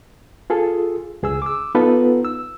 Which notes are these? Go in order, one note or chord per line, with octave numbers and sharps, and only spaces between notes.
F4 G#4 A4
C#2 G#4 E6
D6 E6
B3 D#4 F4 A4 B4
E6